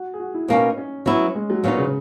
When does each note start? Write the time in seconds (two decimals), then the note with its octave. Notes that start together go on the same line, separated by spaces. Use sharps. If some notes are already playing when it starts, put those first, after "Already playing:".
Already playing: F#4
0.14 G#4
0.20 F#4
0.34 E4
0.48 B2 A#3 C#4 D#4
0.78 C#4
1.06 F#3 B3 C#4 E4
1.35 G#3
1.50 F#3
1.64 A#2 F#3 B3 D#4
1.78 C#3